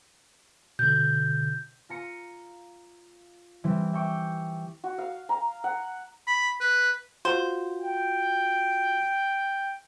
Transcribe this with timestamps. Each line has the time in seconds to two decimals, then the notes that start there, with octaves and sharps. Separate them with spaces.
0.79 B2 D3 G6
1.89 F4 A#5 C#7 D#7
3.64 E3 G3 C4
3.93 E5 G5 C#6 D6 G6
4.84 F#4
4.98 F5
5.29 A#5
5.64 F#5
6.27 B5
6.61 B4
7.25 F4 F#4 C5
7.79 G5